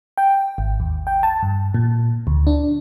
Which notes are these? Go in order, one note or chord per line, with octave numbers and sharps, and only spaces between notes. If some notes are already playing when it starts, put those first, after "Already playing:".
G5
G#1
D#2
G5
A5
G2
A#2
D2
D4